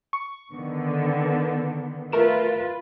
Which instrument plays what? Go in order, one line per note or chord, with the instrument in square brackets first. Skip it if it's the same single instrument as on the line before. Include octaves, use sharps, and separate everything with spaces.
[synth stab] C#6
[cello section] D3 D#3 B3
[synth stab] A3 A#4 E7 [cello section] F4 B4